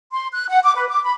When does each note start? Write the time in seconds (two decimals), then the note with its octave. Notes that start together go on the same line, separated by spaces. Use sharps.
0.13 C6
0.32 F#6
0.48 F#5
0.62 D6
0.75 B4
0.89 D6
1.03 B5